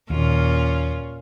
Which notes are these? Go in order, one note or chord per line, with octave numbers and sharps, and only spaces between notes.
D#2 A#2 C#4 F4